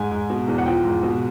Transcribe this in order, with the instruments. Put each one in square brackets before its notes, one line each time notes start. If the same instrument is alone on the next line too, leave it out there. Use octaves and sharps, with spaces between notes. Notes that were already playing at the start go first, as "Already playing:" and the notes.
Already playing: [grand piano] G#2 G#5
G#2
B2
E2
F#5
F3 G5
G#2
B2